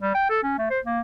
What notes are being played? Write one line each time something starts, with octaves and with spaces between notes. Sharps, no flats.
G3
G5
A4
C#4
A3
C5
A#3